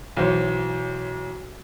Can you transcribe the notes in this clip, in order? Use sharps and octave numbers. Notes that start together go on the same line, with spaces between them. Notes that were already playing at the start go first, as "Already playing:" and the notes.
B1 E3 C5 C#5